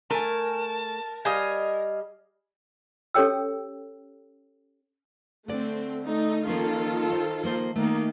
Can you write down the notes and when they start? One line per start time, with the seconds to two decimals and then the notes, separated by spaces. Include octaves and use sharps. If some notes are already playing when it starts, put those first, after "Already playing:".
0.11 A3 A#4 G#5 A5
1.25 G3 D#5 F5 G#5
3.14 C#4 G4 A4 C#5 G5 E6
5.48 D3 A3 C4 D5
6.06 A3 D#4
6.47 D#3 F3 A#3 C#4 F4 A4
7.12 C5
7.43 F3 A#3 C5
7.76 D#3 A3 A#3 D#4